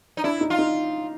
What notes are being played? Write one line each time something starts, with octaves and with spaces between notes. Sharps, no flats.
D#4
D4 E4
D#4
F4
D#4